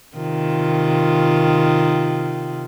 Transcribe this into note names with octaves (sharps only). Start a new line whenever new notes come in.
C3 D#3 F4